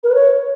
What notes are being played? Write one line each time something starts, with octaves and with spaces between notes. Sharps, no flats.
A#4
B4
C#5